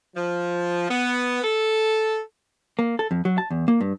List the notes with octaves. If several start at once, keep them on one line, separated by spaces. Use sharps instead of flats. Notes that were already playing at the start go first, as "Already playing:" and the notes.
F3
B3
A4
A#3
A4
F2
F#3
A5
E2
A#3
G2